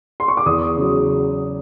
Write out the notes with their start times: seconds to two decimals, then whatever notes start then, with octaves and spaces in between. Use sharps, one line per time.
0.20 C6
0.28 C#6
0.37 D6
0.46 E2 D#6
0.77 C#3 F#3